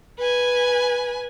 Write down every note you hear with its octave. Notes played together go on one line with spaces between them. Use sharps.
B4 G#5